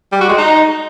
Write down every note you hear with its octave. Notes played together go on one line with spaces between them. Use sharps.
G3
F#4
G#3
D#4